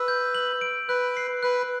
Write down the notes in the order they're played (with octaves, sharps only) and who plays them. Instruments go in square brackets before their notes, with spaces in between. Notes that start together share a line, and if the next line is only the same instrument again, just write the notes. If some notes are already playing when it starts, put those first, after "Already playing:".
Already playing: [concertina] B4 [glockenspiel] E6
[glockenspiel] G6
F#7
D7
[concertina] B4 [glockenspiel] F#6
[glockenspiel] C7
[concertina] B4 [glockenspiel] F#6